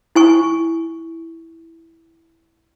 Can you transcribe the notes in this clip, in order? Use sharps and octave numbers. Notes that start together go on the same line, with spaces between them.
E4 G#5 C#6